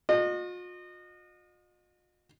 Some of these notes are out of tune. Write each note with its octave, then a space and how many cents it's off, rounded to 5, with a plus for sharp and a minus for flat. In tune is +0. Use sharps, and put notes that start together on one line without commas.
F4 +45 D#5 -30